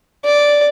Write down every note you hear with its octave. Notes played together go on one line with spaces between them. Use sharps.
D5